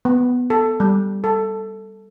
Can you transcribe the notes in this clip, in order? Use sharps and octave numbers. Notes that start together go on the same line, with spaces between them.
B3
A4
G3
A4